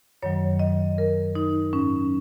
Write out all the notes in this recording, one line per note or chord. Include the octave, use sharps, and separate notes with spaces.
F#2 D#3 F#3 C#5
D#5
A#4
D#4
G#2 F#3 C#4